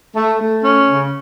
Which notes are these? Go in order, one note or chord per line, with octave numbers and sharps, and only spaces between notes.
A3
A3
C#4
C#3